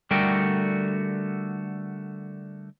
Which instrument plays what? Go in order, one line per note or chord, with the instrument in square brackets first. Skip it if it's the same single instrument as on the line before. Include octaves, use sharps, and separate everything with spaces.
[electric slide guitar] D3 G3 A3 F#4 A#4 G5